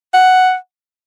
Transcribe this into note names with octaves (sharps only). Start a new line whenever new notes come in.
F#5